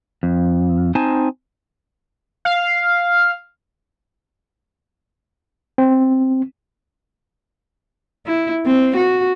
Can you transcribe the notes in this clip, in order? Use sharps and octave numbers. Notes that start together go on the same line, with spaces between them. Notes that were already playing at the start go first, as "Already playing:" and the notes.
F2
C4 D#4 C5 G#5 A5
F5
C4
E4
C4
F#4